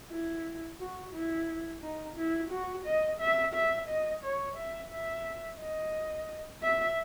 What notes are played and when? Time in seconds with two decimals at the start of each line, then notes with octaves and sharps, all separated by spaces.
0.10 E4
0.80 F#4
1.13 E4
1.82 D#4
2.16 E4
2.51 F#4
2.85 D#5
3.20 E5
3.54 E5
3.88 D#5
4.23 C#5
4.57 E5
4.91 E5
5.61 D#5
6.63 E5